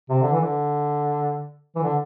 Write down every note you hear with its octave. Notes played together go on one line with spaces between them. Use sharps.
C3
D3
E3
D3
E3
D3